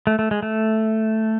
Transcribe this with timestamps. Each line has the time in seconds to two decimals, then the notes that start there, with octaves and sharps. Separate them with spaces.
0.07 A3
0.19 A3
0.31 G#3
0.43 A3